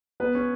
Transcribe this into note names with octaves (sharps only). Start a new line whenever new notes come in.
B3 B4
C#4 C#5